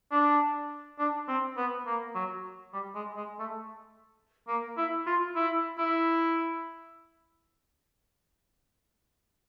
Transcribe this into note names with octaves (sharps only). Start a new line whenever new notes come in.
D4
D4
C4
B3
A#3
F#3
G3
G#3
G#3
A3
A#3
E4
F4
E4
E4